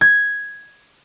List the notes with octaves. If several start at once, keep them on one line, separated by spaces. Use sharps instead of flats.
G#6